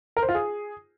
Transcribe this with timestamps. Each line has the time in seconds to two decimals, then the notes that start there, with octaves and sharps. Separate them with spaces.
0.17 A#4
0.23 C5
0.29 F4
0.35 G#4